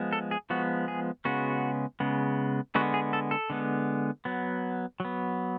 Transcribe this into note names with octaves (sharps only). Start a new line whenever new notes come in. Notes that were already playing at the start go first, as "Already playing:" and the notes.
Already playing: F3 G#3 B3
A4
G#4
F3 G#3 B3 F#4
G#4
C#3 G#3 B3 F#4
C#3 G#3 B3
D3 G#3 B3 F#4
G#4
A4
A4
D3 G#3 B3
F#3 B3
F#3 B3